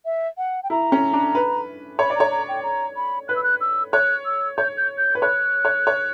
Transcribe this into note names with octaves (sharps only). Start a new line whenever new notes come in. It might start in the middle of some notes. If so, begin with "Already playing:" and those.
E5
F#5
G5
E4 A#5
C#4
D4
B4
C#5 B5
D5
C#5 A#5
A#5
G5
A#5
B5
B4 F#6
E6
F#6
E6
C#5 F#6
E6
C#5 G6
G6
G6
B4
C#5 F#6
C#5
C#5